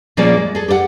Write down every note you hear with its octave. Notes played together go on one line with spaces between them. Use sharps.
A#2 F3 A#3 C#4 G#4 D5
G#3
G#4 A4
G4 A4 D5 F#5